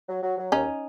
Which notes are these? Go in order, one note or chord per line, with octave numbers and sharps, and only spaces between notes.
F#3
F#3
F#3
D#2 C#4 D#4